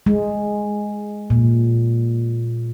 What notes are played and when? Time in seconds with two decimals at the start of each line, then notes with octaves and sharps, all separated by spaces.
0.06 G#3
1.30 A#2